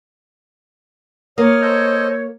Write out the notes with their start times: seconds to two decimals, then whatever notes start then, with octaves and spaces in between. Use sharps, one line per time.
1.38 A#3 C#5 D#6 F6
1.62 A4 C5 D#5